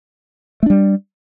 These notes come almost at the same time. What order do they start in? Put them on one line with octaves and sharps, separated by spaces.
A3 D4 G3